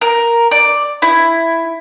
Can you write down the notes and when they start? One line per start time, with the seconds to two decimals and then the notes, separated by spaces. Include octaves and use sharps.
0.01 A#4
0.51 D5
1.02 E4